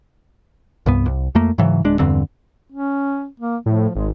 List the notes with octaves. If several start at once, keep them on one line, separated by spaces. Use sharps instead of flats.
C2 G2 B3
C2
F2 A3 A#3
G#2 C#3 E3 F#3
D1 G#3 D4
E2 G2 D3 C4
C#4
A#3
A2 F3
G#1 G#3